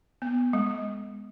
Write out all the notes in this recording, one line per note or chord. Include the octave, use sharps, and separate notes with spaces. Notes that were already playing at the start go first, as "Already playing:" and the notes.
B3
G#3